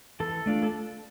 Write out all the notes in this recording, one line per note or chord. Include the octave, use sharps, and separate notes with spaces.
E3 A4
A3 D4 F4
A4